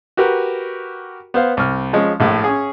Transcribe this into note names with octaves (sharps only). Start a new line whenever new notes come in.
F#4 G4 A#4 B4
B3 C5 F5
C2 F6
F3 G#3 C#4
A#1 A2
C#4 G#4